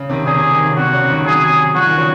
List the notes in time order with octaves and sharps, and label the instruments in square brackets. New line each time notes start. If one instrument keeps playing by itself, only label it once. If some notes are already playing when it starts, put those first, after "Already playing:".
Already playing: [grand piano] C#3
C3 D#3
[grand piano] C3 D#3 [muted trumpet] G#4
[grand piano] C3
D#3
C#3
[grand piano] C3 [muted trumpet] F#4
[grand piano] C#3
C3 D#3
[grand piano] D#3 F#3 [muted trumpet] G#4
[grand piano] F3 [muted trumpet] F#4
[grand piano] D#3
C#3 F3